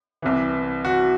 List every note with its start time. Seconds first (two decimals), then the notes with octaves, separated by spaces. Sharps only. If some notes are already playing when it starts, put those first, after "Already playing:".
0.22 C2 C3 E3
0.85 F#4